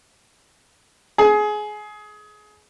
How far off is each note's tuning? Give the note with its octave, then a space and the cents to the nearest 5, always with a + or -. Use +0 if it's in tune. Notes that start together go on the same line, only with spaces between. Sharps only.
G#4 +20